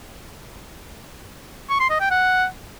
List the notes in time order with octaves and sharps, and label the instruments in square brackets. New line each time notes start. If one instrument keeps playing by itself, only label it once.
[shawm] C#6
C6
D#5
G5
F#5